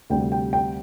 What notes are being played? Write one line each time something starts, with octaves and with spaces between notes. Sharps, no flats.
D2 C3 G3 G5
G5
G5